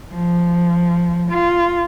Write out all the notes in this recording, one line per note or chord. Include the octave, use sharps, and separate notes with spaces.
F3
F4